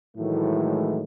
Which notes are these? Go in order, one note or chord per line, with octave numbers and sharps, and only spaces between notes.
A2 D#3 E3 F#3 G#3 A3